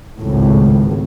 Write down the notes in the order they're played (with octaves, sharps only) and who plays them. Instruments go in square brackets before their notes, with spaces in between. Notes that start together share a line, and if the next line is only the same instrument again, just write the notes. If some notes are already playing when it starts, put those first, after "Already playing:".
[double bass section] G#1 C#2 A2